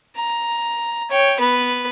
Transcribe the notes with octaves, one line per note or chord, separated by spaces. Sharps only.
A#5
C#5 G5
B3 B4